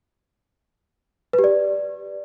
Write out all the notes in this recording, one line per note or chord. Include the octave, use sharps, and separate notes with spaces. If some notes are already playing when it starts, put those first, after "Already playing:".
B4
G4
D5